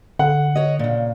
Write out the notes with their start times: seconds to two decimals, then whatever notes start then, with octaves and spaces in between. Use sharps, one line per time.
0.19 D3 F#5
0.55 C#5 D#5
0.79 A#2 C#3